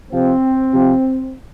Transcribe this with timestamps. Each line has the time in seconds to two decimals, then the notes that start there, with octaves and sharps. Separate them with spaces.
0.10 C3 F3 C4
0.70 C3 F3